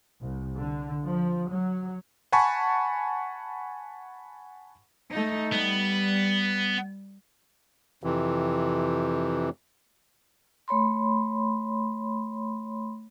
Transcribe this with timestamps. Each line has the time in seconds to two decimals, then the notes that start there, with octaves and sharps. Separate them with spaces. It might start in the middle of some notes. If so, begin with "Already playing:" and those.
0.21 C2
0.57 D3
1.06 F3
1.50 F#3
2.32 F#5 G#5 A5 B5 C#6
5.11 A3 D#4
5.53 G3 B3
8.04 F2 C3 E3
10.68 A3 C#5 B5 C6